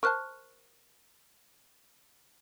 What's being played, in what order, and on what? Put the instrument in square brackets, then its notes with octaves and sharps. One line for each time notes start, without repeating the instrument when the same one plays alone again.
[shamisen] A#4 C5 A5 [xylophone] C#6 F6 F#6